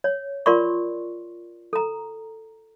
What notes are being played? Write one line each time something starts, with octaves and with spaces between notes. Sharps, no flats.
C#5
F4 A#4 D5 C6 C#6
A4 A#5